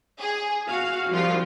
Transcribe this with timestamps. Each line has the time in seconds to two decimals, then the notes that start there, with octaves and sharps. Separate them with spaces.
0.20 G#4
0.68 F#4 F5
1.10 C2 F3 F4